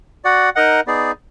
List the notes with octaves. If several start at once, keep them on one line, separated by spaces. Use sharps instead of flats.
F#4 D5 F#5
D#4 A#4 D#5 F#5
B3 D#4 G#4 D5